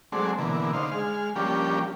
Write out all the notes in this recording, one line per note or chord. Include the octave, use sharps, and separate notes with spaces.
F#3 G#3 A3 C4 D4
B2 D3 E3 A#3
D3 D#4 C5 F5
G#3 F6
F3 G3 A#3 C#4 D4 G4